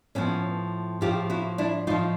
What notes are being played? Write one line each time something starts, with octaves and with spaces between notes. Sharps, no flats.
A2 F3 B3 C#4
A2 F3 F4 G4
E4 F#4
D4 E4
A2 F3 D#4 F4